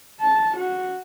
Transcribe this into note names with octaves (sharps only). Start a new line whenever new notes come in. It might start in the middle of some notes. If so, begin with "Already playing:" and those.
A5
F#4